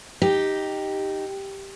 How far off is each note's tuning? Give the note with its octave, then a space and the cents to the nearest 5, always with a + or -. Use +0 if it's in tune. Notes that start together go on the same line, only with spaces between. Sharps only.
D#4 +0 G4 +0